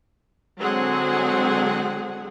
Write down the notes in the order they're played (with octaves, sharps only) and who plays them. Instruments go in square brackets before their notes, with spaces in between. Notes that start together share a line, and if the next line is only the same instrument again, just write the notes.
[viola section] D3 F#3 G#3 C4 G#4 F#5